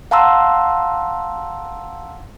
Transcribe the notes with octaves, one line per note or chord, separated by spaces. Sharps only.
F5 F#5 A5 A#5 C6 E6